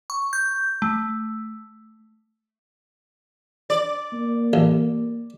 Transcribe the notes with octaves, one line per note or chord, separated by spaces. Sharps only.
C#6
G6
A3
D5
A#3
A1